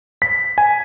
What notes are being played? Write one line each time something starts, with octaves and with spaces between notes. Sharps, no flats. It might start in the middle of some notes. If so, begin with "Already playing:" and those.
B6
G#5